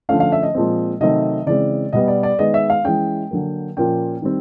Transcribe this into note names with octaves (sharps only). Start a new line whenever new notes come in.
D3 F3 A3 C#4 F5
F5
E5
D#5
A#2 F3 G#3 C4
C3 D#3 F#3 A3 C4 D#5
C#3 E3 G#3 C4 D5
B2 G3 B3 D#5
D5
D5
D#3 G#3 B3 D#5
E5
F5
E3 G#3 C#4 G5
D3 F#3 A#3
A#2 F3 A#3 C#4 G5
D#3 G3 C4